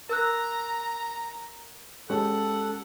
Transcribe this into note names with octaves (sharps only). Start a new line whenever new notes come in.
A#4 A#5 E6 F#6
G#3 C#4 G4 A4 F#5